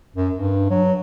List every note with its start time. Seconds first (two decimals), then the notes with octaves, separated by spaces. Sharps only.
0.16 F#2
0.35 G2
0.70 F#3